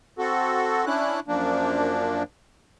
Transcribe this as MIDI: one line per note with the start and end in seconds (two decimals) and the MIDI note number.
0.19 0.85 60
0.19 0.85 66
0.19 0.85 69
0.86 1.20 61
0.86 1.20 62
0.86 1.20 64
0.86 1.20 90
1.28 2.23 42
1.28 2.23 53
1.28 2.23 58
1.28 2.23 62